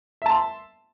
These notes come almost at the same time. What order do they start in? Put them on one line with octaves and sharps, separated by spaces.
E5 A5 C6